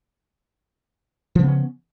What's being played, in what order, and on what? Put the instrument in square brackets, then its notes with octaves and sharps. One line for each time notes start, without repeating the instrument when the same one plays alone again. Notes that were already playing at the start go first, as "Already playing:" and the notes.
[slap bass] F3
C#3
B3
C#4